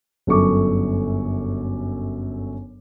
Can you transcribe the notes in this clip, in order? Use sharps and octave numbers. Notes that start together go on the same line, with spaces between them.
G1 F#2 A4 C#6 D6